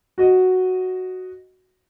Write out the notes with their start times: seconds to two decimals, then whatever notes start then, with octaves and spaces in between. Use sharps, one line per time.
0.18 F#4 D#5